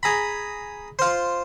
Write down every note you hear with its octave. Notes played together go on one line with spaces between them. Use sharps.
G#4 A#5 B5
F4 C5